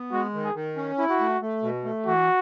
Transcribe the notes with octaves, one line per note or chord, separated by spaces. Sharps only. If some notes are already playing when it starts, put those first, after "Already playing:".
Already playing: B3
G#3 F#4
D#3
G#4
D#3
C#4
E4
F#4
A3
A3
B2
A3
E3 F#4